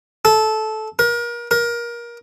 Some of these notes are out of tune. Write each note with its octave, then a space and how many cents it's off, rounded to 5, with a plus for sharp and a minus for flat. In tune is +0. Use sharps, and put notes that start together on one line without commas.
A4 -15
A#4 +35
A#4 +25